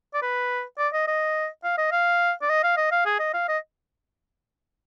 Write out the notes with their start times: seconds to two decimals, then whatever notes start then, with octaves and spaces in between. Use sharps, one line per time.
0.14 D5
0.22 B4
0.78 D5
0.93 D#5
1.07 D#5
1.64 F5
1.78 D#5
1.92 F5
2.42 D5
2.49 D#5
2.63 F5
2.77 D#5
2.91 F5
3.06 G#4
3.19 D#5
3.34 F5
3.48 D#5